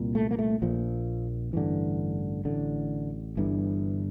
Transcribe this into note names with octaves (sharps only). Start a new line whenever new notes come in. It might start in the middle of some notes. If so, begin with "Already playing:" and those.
Already playing: C2 A#2
A3
A#3
A3
A#1 A#2 F3
A1 G2 D3 E3
A1 A2 D3
G1 G2 D3 E3